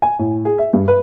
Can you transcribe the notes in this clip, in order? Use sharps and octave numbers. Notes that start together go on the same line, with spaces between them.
G#5
A2
G#4
E5
G2
B4